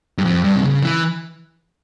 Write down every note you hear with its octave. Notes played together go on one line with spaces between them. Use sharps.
G2
F2
G2
C3
C#3
E3